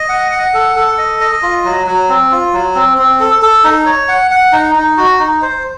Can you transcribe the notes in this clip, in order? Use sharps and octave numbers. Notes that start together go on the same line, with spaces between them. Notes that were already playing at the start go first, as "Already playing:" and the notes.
Already playing: D#5
F#5
F#5
A4
A4
D#5
D#5
F4
F#3
F#3
C4
F4
F#3
C4
C4
A4
A4
D#4
C#5
F#5
F#5
D#4
D#4
F#4
D#4
C5